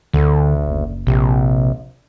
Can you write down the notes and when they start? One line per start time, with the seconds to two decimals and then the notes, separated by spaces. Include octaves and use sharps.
0.13 D2 D3
0.66 F#1
1.07 A#1 C3